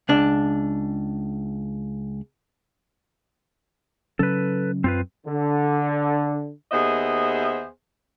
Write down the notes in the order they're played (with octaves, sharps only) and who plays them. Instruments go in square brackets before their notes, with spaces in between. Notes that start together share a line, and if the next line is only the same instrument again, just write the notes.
[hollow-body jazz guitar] C#2 D4
[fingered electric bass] C#3 F#3 C#4 [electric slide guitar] A4 B4
[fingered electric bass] F#2 [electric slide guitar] C4 F4 B4
[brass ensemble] D3
[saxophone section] D#2 B3 G#4 C5 D#5 E5